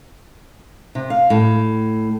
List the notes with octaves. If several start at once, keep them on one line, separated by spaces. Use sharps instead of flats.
C3
F5
A2